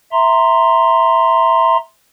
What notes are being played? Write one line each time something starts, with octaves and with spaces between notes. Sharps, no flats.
E5 A#5 C6